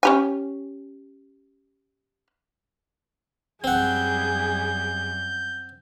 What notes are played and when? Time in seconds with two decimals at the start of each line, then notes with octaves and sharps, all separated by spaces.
0.03 C#4 G4 G#5
3.64 F#2 G3 C4 G#4 F#5 G6